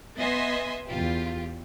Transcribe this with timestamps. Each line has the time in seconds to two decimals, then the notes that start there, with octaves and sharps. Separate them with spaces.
0.17 B3 D#5 E5 G#5 C6
0.86 E2 F4 G4